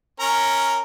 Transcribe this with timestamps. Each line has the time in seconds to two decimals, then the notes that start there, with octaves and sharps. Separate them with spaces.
0.20 C#4 A#4 A#5